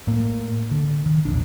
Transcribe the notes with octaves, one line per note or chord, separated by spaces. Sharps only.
A2 A#3
D3
D#3
E1 A#1 D4